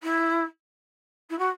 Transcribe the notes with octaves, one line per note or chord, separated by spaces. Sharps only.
E4
E4
F#4